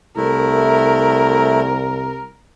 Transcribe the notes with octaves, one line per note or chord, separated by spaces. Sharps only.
C2 A3 E4 A#4